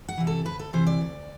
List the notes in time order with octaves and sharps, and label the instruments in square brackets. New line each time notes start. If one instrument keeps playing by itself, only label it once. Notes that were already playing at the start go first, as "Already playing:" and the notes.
[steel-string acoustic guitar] F#5
C3 E3
A4
D2 B4
A4
C3 E3 C5
D5
D2